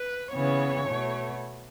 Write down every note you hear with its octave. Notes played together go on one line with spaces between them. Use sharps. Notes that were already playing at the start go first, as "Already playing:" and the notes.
Already playing: B4
C#3 E3 B3 C#5
B2 A3